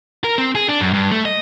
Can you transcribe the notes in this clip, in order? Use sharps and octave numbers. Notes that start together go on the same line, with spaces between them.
A#4
C4
G#4
D4
F#2
G2
A3
D#5